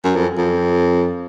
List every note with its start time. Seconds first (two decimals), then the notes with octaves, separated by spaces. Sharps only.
0.04 F#2
0.16 F2
0.38 F2